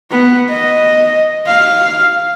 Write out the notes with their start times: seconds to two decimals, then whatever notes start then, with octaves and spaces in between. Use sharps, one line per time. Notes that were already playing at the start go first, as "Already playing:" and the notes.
0.11 B3
0.50 D#5
1.47 F5